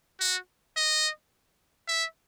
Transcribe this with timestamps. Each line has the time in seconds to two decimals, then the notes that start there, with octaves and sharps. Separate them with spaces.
0.20 F#4
0.76 D#5
1.88 E5